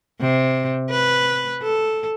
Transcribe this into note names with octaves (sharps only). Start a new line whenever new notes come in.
C3
B4
A4